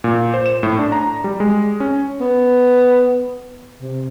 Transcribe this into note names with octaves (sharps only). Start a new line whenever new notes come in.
A#2
C5
E7
A2
D4
A#5
G3
G#3
C#4
B3
C3